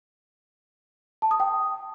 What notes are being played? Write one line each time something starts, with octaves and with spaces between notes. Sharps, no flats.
A5
D#6
G5